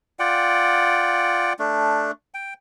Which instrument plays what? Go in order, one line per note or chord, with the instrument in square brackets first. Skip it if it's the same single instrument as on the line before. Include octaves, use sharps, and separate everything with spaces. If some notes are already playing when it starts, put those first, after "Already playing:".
[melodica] F4 D5 F#5 G5
A3 D4
G5